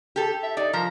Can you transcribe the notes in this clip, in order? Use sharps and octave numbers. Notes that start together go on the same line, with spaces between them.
G4 A4
E5
D#4 D5
F3 A#5